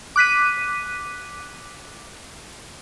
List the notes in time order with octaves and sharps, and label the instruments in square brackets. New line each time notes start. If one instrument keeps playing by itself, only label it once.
[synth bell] D6 F#6 B6 D#7